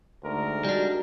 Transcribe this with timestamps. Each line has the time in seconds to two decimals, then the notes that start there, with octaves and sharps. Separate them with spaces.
0.23 D2 G#3 D#4 A#4
0.65 G3 D4 F#4